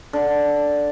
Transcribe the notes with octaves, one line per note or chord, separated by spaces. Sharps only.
D3